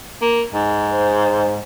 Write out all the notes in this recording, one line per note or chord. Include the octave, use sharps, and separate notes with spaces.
A#3
G#2
C5